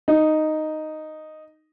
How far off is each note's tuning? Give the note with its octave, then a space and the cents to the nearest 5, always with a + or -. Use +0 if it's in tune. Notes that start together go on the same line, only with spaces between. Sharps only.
D#4 -5